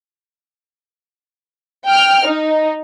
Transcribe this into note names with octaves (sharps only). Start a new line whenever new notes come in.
G5 F6
D#4